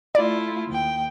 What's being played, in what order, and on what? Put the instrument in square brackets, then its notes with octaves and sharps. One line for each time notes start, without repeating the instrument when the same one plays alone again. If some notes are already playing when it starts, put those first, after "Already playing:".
[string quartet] A3 E4 F4 [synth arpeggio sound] D5
[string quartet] D#2 G5